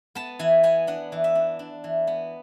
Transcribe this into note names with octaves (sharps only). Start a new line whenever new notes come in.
B3 A5
E3 G#5
B3 G#5
D4 F#5
E3
E5
D4
D4
E3
B3